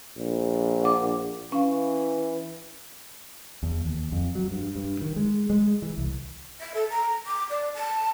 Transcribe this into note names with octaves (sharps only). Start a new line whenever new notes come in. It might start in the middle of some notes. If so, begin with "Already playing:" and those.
A#1
F#5 D6
E3 C#4 F5
E2
D#2
F2
F#3
G2
G2
D#3
G#3
G#3
E3
C2
E5
A4
A#5
D6
D5
A5